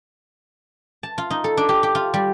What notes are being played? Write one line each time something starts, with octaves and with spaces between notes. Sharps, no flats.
A5
F4
D#4
A4
D4
G4
G4
F4
G3